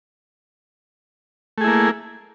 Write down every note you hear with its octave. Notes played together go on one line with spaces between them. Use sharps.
A3 A#3 E4 G#4